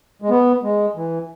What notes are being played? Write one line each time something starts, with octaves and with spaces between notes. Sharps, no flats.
G#3
B3
G#3
E3